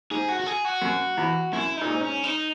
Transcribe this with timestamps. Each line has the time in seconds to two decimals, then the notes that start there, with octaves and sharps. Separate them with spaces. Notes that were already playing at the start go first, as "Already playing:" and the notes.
0.11 G#2 G#4
0.29 F#4
0.40 F#4
0.46 G#4
0.65 F#4
0.82 F#2
1.17 E2
1.53 F#2 E4
1.77 A#2 D#4
1.88 G#2
2.01 C#4
2.24 D#4